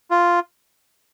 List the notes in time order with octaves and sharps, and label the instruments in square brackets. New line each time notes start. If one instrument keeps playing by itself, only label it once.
[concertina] F4